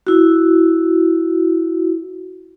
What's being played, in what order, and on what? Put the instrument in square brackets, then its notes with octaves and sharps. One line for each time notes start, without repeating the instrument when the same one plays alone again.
[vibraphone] E4 F#4